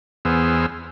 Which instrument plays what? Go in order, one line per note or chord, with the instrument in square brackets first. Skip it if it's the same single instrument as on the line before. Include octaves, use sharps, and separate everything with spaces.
[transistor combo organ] E2 B3 G#4 C5 E6 F6